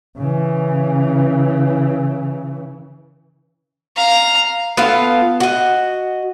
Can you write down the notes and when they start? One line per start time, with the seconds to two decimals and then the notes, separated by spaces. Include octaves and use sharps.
0.18 C#3 E3
3.96 F5 A#5
4.77 B3 F4 A4 F5
5.40 F#4 D#5